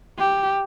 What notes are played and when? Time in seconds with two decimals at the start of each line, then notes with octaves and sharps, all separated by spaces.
0.19 G4